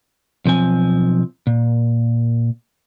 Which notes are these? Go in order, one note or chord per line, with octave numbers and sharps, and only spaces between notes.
B1 F3 C4 G#5
A#2